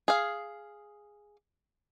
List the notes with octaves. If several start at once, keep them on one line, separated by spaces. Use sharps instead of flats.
G#4 F5